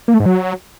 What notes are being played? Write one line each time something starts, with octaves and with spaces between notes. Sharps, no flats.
A#3
A3
G#2
F#3